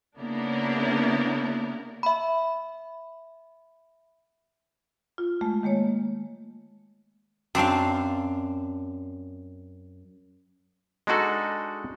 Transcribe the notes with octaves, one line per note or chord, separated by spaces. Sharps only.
C#3 A#3 B3 D4 E4 A#4
E5 B5
F4
G#3 A3
D#3 G#3 A#3 C#5
F#2 C4 D4 F5
G#3 D4 D#4 F#4 A4